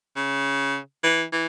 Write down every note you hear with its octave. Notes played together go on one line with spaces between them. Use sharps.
C#3
E3
E3